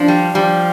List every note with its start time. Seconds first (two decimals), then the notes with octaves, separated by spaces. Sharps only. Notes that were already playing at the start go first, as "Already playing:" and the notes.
Already playing: F3 D4
0.08 G3
0.35 F3 G3